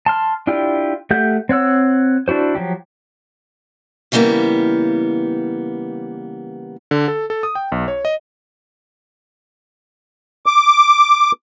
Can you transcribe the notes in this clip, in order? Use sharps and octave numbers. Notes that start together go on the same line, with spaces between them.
A5 C6 F6
D4 E4 F4 G4
A3 G4 E5 F#5 G6
C4 C#5 F#5 E6
D4 E4 F#4 C5
F3 F#3 G4
C#3 E3 G3 A#3 B3
D3
A4
A4
D#6
G5
B1
C#5
D#5
D6